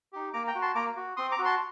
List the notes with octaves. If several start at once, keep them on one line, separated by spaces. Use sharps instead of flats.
D#4 G4
A#3 A#5 D6
G5 A#5
F#4
A5 C6
A#3 A#5 D6
F#4
C4 C6 D#6
A#5 D6
F#4
A5 C6